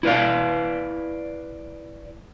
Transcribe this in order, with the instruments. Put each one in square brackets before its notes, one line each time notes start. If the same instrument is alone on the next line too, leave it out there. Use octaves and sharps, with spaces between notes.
[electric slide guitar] E4 B4 D5 F5